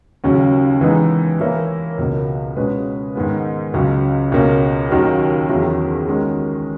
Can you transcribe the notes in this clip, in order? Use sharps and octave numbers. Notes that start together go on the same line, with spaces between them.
D#2 C#3 F#3 C#4
E3 G#3 B3 D#4
E3 A#3 E4 A#4 C#5
C#2 B2 A#3
B2 G#3 C#4 G#4 B4
G#2 D#3 G#3 B3
C#2 C#3 F#3 C#4
C#2 B2 A#3 C#4
D#2 D#3 F#3 C#4 F#4
E2 D#3 F#3 C#4 E4
D#3 G#3 C#4 F#4